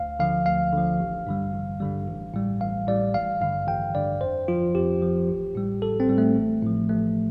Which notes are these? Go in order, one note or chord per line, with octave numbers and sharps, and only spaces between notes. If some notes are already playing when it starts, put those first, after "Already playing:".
Already playing: D2 F5
D3 F3 F5
D2 F5
D3 F3
A1
G2 D3 G3
A1
G2 D3 G3
A1
A2 G3
A1 F5
A2 G3 D5
A1 F5
G2 D3 F5
A1 G5
G2 D3 D5
F2 C5
F3 F4
F2 G4
F3
A1
A2 G3
A1 A4
C4
A2 G3
A3
A1
A2 F3
A1 A3